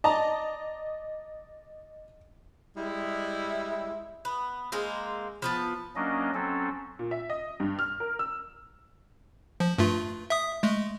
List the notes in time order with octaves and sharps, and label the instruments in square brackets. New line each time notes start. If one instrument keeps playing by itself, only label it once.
[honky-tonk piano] D5 D#5 [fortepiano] A5 A#5
[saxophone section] G3 G#3 E4
[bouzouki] B3
G#3 A#3 C4
F3 B3 A5
[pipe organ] F#3 A#3 C#4 D4 D#5
F#3 C4 C#4 A4
[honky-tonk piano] A#2
E5
D#5
G2
F6
A#4
E6
[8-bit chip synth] F3
G2 A3 F4
E5 D#6
G#3 A3